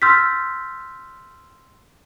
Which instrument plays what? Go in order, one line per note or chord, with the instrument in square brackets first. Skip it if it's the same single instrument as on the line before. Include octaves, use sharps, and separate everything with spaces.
[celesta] C6 E6 F6 G6 A6 B6